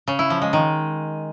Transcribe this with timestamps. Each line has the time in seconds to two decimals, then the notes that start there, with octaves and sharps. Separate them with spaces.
0.08 C#3
0.19 E4
0.30 F3
0.42 G#3
0.53 D#3